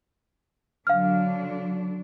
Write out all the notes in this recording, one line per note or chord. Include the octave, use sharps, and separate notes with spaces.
D3 F#3 D4 F5 F6